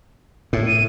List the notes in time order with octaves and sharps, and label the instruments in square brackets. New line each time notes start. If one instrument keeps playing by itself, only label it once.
[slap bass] A2
[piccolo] D#7